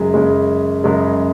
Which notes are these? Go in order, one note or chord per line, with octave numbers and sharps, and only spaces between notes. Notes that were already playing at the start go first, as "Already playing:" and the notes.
Already playing: F#2 C#3 G#3
F#2 C#3 G#3
F#2 C#3 G#3